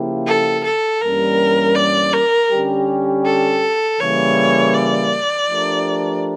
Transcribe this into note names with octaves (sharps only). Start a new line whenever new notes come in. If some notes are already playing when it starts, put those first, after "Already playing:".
Already playing: C#3 F3 A#3 E4 G4
A4
A4
G2 E3 G3 A#3 C#4 A#4
D5
A#4
D3 G3 C#4 G4
A4
C#3 E3 G3 A#3 C#5
D5
F3 A3 D4 G4 A#4